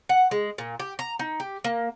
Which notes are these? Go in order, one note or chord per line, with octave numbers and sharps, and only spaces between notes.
F#5
G#3
A#2
G4
A#5
D#4
G4
A#3